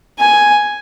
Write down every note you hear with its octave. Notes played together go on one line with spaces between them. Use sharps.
G#5